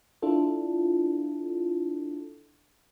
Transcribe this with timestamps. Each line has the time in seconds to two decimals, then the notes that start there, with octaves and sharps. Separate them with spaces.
0.22 D4 E4 F4 A4